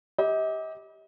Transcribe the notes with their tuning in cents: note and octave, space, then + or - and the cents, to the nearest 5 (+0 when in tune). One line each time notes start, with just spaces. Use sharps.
G4 +0 D#5 +40